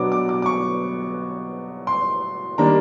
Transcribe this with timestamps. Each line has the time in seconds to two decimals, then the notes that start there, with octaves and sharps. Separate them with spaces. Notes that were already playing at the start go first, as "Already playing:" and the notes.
Already playing: B2 F#3 B3 D4 D6
0.12 D6
0.29 D6
0.42 D6
0.46 C#6
1.87 C6
2.58 D#3 G3 A#3 D4 A#5